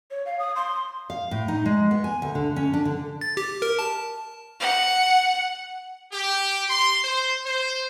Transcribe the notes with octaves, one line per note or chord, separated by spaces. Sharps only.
C#5
F5
D#6
C6
F5
A2
D#4
G#3
B3
G#5
D2
D3
C#4
D4
D3
A6
G4
A#4
A5
F#5
G4
C6
C5
C5